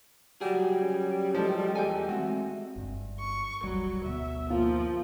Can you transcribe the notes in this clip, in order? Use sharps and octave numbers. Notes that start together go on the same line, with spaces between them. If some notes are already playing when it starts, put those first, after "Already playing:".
F#3 G3 F#4 G#4
C#4
F3 G#3 A4
E2 A4 D#5 G5 G#5
G#3 A3 C4 F#4
G1 G2
C#6
D#1 G#1 F#3 G3
D2 B2 B3 E5
F3 A#3 F4